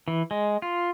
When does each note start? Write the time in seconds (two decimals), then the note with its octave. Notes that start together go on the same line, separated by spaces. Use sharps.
0.08 E3
0.31 G#3
0.62 F4